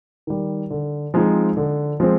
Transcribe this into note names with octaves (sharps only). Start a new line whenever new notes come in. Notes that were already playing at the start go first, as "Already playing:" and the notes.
D#3 G3
D3
F3 G#3 C4 D#4
D3
F3 G#3 C4